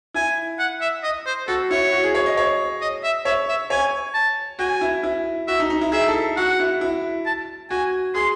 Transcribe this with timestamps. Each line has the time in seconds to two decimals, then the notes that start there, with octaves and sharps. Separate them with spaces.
0.14 E4 G#5
0.59 F#5
0.81 E5
1.03 D#5
1.26 C5
1.48 F#4 A4
1.71 E4 C#5
1.92 F#4
2.04 G#4
2.15 C#5
2.26 D#5
2.37 C#5
2.81 D#5
3.04 E5
3.25 C#5 E5
3.48 E5
3.70 C#5 G#5
4.14 A5
4.59 F#4 G#5
4.81 E4
5.03 E4
5.47 F#4 E5
5.60 D#4
5.70 D#4
5.81 E4
5.92 G#4 E5
6.08 A4
6.37 F#4 F#5
6.60 E4
6.81 E4
7.26 A5
7.70 F#4 G#5
8.15 G#4 C6